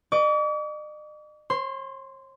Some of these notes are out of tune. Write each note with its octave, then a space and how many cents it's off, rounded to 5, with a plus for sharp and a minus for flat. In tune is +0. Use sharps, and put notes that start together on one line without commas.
D#5 -45 D6 -45
C#5 -45 C6 -10